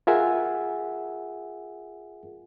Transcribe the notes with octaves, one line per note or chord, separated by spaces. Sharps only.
F4 G#4 A#4 E5 F#5 G#5